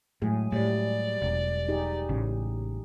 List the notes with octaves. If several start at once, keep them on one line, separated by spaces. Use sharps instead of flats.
A2 F#3 G#3 G#4
A2 G3 D5
E1
D#4 G4 G#4
A1 C#3